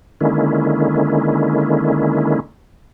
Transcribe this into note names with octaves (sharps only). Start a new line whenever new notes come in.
D3 D#3 G#3 A#3 C#4 E4